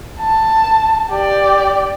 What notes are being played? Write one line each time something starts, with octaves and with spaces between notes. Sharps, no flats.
A5
G4 D5